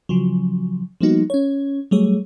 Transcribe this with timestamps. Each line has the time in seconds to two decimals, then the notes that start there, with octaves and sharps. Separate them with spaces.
0.09 C#3 F3 F#3
1.01 F3 G3 A#3 B3 D#4 F#4
1.30 C#4 C#5
1.91 F#3 G3 A3 G#4 C#5